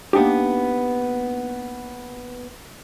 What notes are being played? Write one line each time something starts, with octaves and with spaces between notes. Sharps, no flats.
A#3 B3 D4 D#4 G4